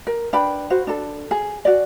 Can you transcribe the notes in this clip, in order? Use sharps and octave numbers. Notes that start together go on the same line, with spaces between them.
A#4
D4 B4 G5 B5
F#4 C5
D4 A4
G#4
F#4 D5